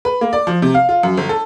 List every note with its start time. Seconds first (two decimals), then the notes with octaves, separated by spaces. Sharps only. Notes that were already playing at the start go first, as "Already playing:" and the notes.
0.05 B4
0.21 A#3
0.33 D5
0.47 F3
0.62 C3
0.74 F5
0.89 F4
1.03 F#2
1.17 G1
1.29 A4